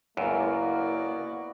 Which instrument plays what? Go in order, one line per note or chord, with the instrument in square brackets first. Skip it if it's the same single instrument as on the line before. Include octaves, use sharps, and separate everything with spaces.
[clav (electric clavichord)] C#2 F#2 [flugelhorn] A#3 [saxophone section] B3 F#4 D5 [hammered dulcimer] E4 F5